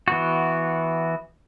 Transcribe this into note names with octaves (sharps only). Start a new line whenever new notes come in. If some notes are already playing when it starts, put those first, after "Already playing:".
E3 B3 F#4